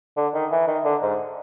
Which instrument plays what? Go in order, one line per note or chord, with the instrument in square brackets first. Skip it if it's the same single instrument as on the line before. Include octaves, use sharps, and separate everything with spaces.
[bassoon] D3
D#3
E3
D#3
D3
G#2